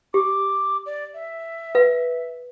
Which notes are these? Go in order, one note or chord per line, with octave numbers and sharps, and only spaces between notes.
G4 D6
D5
E5
B4 F5